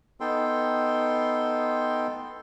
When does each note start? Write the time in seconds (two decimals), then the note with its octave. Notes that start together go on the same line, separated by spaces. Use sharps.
0.20 B3 D#4 A4 G5 C6